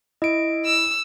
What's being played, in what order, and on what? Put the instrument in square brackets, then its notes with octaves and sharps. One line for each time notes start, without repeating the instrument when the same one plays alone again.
[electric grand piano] E4 [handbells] D#5 D7
[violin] E6